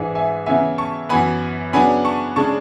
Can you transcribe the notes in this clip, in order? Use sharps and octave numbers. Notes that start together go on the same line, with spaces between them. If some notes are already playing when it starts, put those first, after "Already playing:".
Already playing: G#2 E3 G#3 D4 E5 G#5
E5 G#5
C#3 E3 B3 E5 G#5
A5 C#6
F#2 E3 B3 G#5 B5
C#3 F#3 B3 D4 G#5 B5
A5 C#6
C#3 G#3 D4 A5 C#6